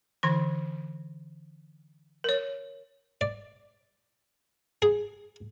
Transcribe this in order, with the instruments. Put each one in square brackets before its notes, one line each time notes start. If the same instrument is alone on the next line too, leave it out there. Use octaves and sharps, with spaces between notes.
[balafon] D3 E3 C6
A#4 C#5
[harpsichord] D5
G#4